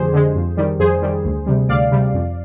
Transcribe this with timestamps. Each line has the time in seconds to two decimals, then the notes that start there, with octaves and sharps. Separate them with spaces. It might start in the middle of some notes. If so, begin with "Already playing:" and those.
Already playing: F2 D3 G#3 G4 G#4 C5
0.13 D3 G#3
0.35 F2
0.57 D#3 G3
0.79 F2 G#4 C5
1.02 D#3 G3
1.25 D2
1.46 C3 G3
1.69 D2 D5 F5
1.91 C3 G3
2.14 F2